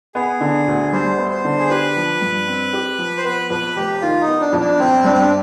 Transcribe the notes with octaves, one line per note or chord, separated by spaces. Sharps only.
B3 G#4
D3
D2
G3 C5
B3
C5
D3
G#4
G4 B4
F3
G2
C4
G4
F3
C5
B3 B4
F2 B4
F1 G4
D#3 F4
D#4
B3
D4
F2
D4
G1 C4
G2 D4
C4
D4